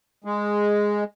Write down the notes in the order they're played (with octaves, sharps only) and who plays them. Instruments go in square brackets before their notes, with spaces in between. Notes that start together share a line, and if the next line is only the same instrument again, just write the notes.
[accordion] G#3